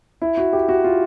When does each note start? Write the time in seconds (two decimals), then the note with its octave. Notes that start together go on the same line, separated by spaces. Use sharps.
0.22 E4
0.37 F#4
0.53 G4
0.69 F#4
0.84 F4